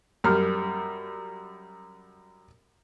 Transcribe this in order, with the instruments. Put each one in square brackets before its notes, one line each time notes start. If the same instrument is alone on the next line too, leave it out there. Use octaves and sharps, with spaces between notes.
[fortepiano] F#2 G3 F6